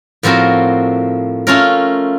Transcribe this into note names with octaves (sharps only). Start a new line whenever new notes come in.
A2 F3 C4 F#4 A#4
A3 C#4 F4 A#4